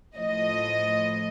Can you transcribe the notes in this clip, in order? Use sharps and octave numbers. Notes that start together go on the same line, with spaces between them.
A2 F3 D#5